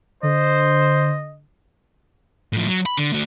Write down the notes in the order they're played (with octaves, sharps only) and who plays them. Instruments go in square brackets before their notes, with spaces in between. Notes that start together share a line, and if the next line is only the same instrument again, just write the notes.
[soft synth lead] D3 [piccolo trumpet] C5 [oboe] D#5
[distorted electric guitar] A2 F3
F#3
B5
D3
A3 F#4